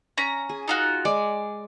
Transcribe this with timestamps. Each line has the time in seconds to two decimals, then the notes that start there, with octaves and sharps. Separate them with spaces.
0.18 C#4 A#5
0.49 G#4
0.68 D#4 F4 F#4
1.05 G#3 D5